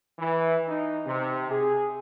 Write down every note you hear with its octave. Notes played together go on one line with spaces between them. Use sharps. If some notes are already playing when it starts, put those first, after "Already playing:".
E3
D#4
C3
G#4